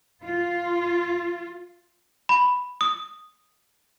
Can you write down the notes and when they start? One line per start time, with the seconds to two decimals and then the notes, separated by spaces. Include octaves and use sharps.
0.23 F4
2.29 B5
2.81 D#6